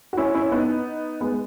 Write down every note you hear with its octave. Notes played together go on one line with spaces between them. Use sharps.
F#4
C#4 E4
C#4 E4
B3 D#4
G#3 B3